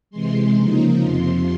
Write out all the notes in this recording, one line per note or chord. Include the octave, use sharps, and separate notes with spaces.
C3 E3 G#3 C6
C#3 F3 A#3 D#4
F2 C3 F3 C6